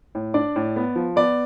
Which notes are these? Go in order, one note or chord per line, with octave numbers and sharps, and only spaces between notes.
A2
D4 D5
A2
B3
F3
B3 D5